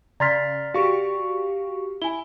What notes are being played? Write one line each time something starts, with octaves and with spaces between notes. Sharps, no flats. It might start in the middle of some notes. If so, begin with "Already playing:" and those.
C#3 D5 A#5 C6 F6 A6 B6
F#4 G4 F5 C#6
E4 G#5 G7